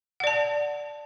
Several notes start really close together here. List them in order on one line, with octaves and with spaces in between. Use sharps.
F#5 D5 A5